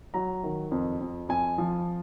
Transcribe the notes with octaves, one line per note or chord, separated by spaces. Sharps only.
F#3 A#5
D#3
F2
F2
F2 G#5
F3